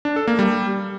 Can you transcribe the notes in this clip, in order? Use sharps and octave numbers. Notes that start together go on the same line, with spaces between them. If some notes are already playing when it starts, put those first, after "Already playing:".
D4
A4
A#3
G3